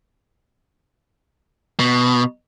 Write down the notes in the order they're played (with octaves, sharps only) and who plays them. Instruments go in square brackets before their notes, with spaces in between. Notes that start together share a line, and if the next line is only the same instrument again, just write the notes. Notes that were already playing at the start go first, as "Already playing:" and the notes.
[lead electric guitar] B2